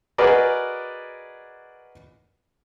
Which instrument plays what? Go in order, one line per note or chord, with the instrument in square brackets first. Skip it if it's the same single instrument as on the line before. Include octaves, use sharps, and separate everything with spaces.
[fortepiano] F#4 G#4 A#4 B4 D5 D#5